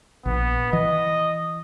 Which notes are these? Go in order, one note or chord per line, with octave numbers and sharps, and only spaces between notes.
A#1 B3
E3 D#5